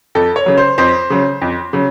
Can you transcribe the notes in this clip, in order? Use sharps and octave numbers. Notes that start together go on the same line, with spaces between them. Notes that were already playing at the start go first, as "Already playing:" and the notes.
F2 A4
C#5
C#3 F#3
C5
F2 C5
C#3 F#3
F2
C#3 F#3